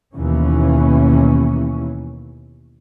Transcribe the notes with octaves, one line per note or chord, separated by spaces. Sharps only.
D#2 B2 E3 C#4